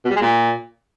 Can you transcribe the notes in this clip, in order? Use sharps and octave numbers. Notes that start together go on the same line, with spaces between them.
B2
G3
G#3
A#2